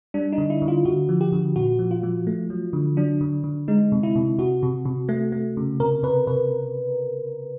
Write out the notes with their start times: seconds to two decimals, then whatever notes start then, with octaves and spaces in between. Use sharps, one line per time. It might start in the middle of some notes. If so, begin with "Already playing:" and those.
0.14 G3 D4
0.33 D#4
0.38 D3
0.50 E4
0.62 D3
0.68 F4
0.85 D3 F#4
1.09 F3
1.21 G4
1.32 D3
1.56 A#2 F#4
1.79 F3
1.91 F4
2.03 F3
2.27 A3
2.50 F#3
2.73 D3
2.97 F#3 D4
3.21 D3
3.44 D3
3.68 G#3 D#4
3.92 C3
4.03 E4
4.16 C3
4.38 C3 F#4
4.63 C3
4.85 C3
5.09 A3
5.32 A3
5.57 C#3
5.80 C3 A#4
6.03 C3 B4
6.27 C3 B4